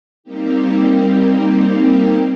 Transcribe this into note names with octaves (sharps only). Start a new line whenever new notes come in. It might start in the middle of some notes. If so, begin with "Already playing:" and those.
G3 A#3 C4 D#4 G4